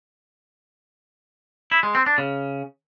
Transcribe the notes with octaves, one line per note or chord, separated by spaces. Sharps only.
E4
G#3
C4
D4
C#3